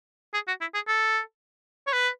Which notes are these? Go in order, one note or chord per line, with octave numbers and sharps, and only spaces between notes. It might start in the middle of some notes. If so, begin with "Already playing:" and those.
G#4
F#4
E4
G#4
A4
C#5
B4